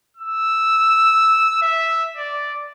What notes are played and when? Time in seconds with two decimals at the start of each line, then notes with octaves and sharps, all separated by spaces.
0.17 E6
1.62 E5
2.17 D5